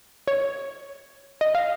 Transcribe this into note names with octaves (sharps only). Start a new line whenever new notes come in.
C#5
D#5
F5